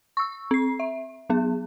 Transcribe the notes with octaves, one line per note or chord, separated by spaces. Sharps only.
C#6 E6
C4 C7
E5
F#3 B3 G#4